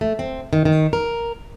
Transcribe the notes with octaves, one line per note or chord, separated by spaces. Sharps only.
A3
C4
D#3
D#3
A#4